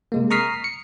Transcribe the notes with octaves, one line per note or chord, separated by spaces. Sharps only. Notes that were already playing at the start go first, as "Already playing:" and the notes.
C3 G#3 A#3
A#5 C#6 D#6 F6 B6 C7
C#7